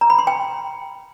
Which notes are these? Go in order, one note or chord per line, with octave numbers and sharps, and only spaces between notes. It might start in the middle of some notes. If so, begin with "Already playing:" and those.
A#5
B5
C6
G5